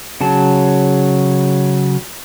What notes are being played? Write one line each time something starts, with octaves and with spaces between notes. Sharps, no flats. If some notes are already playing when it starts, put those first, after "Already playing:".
C#3 F#3 A5